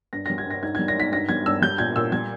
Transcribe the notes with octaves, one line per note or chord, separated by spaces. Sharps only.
G2 A#6
G3 A#6
G#6
G2 A#6
G#2 G#6
G3 G#6
A#6
G#2 B6
G2 A#6
G3 G#6
G2 E6
G3 G6
A#2 G#6
A#2 E6
G3 G#6